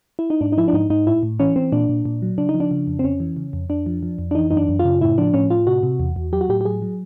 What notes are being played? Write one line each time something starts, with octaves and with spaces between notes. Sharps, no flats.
E4
D#4
G#2 D4
D#4
F3 E4
D4
G#2 D#4
G#2 D#4
A2 E4
A2
E3 C#4
E3 C4
A#2 D4
A#2
A#2
F#3
C#3 D4
D#4
F3
D4
C#3
F2
C4
F2 C#4
E3
C#3
F2
F2 D4
F3
F3
F2
D4
E3 D#4
F#2 D#4
D4
F#2
F4
C#3
A2 E4
F3 D4
A2 C#4
A2 F4
C3 F#4
C3
E2
E2
F#3 G4
F#4
A2 G4
G4
F#3 G#4
F#3